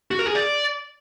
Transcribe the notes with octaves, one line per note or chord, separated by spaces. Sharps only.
F#4
A#4
G#4
D5